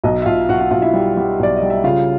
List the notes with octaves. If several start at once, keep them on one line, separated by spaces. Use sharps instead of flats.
B1 D#5
E5
B1 F4 F5
B1 F#4 F#5
F#4 F#5
B1 F4 F5
E4 E5
G3
G3
B1 D5
D#5
G3
E5
C#3 F4 F5